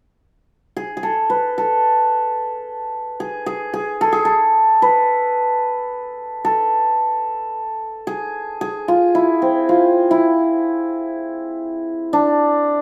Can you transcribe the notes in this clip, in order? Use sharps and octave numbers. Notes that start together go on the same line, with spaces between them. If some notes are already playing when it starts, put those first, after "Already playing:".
G#4
G#4
A4
B4
A4
G#4
G#4
G#4
A4
G#4
A4
B4
A4
G#4
G#4
F4
E4
C4
F4
E4
D4